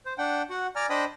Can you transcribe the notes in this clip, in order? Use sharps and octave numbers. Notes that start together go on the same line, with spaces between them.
C5
D4 F#5 G5
F#4 F#5
D5 G#5 A#5 F6
D4 C5 D#5 G5 B5 D#6